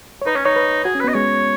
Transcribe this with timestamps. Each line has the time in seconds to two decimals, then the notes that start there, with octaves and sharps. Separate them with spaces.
0.22 C#5
0.26 D#4 B4
0.35 C#4 C#5
0.45 D#4 C#5
0.56 B4
0.84 F#4 G#4
0.95 C#4
1.00 B3 B4
1.08 D#5
1.14 G#3 C#5